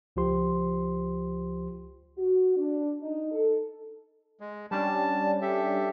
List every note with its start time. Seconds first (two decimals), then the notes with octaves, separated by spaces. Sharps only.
0.16 C#2 F3 F4 G4 C5 C6
2.17 F#4
2.57 D4
3.01 D#4
3.32 A4
4.41 G#3
4.71 G3 C#4 D4 A5
5.42 G4 A4 E5